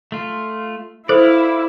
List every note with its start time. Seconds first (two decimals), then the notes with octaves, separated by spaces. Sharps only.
0.12 A3 F4
1.09 E4 A4 C5 D5 F5